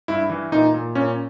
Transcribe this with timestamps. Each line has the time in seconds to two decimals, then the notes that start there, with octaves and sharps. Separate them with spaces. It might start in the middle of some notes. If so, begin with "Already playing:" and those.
0.08 G2 E4
0.30 E3
0.52 A#2 D#4
0.74 A#2
0.95 A#2 C#4